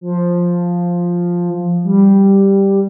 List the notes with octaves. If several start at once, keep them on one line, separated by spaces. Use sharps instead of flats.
F3
G3